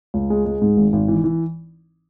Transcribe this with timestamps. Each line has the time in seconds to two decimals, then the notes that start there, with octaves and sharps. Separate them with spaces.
0.14 C#2
0.30 G#3
0.45 G#3
0.62 G#2
0.77 G#1
0.93 G#1
1.08 E3
1.24 E3